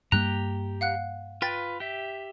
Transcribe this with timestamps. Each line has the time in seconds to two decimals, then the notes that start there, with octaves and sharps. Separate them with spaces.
0.12 G2 G3 A#3 G4 A#5 F#6
0.81 F5 F#5 F#6
1.42 F4 B4 G5 A6
1.80 G4 E5